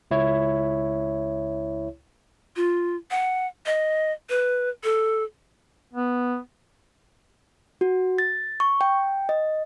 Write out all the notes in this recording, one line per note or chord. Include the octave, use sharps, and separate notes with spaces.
C#2 E4 C#5
F4
F#5
D#5
B4
A4
B3
F#4
A6
C#6
G5
D#5